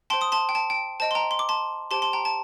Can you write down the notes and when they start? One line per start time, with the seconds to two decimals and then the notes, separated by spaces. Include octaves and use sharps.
0.10 G5 A5 C6
0.13 C5
0.21 C6 D#6
0.32 A5 C6
0.49 G5
0.55 A5
0.70 G5
1.00 C5 D#5 G5 A5
1.11 C6
1.15 G5 A#5
1.31 C6
1.39 D6
1.49 A5 C6
1.91 G4 C5 G5 A5 C6
2.02 A5 C6
2.13 G5 A#5
2.25 A5